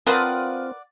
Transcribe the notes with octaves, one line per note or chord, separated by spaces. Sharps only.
C4 F4 A#4 B4 D5 F#5 A5 D#6